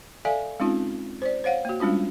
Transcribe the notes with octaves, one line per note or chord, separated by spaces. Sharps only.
A4 D5 E5 F5 G#5
G#3 C4 C#4 D#4 F4
C5 D5
C5 C#5 F5 F#5
A#3 F#4
G3 G#3 C#4 D4 F4